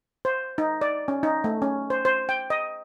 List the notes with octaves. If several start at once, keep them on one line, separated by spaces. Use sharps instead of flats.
C5
D#4
D5
C#4
D#4
A3
C#4
C5
C5
G5
D#5